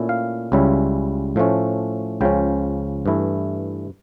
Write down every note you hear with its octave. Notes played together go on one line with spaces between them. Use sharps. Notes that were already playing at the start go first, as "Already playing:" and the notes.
Already playing: A#2 A3 C#4 E4
F5
C#2 C#3 G3 C#4 E4
A2 F3 A3 C#4
C#2 C#3 F3 C#4 G5
G2 E3 A3 E4